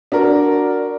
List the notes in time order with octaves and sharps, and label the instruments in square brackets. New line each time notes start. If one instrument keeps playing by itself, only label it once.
[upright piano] D4 F#4 A#4